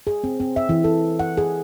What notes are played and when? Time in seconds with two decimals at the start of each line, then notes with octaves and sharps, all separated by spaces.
0.07 G#4
0.24 C4
0.40 C4
0.56 E5
0.69 E3
0.84 A4
1.19 F#5
1.37 G#4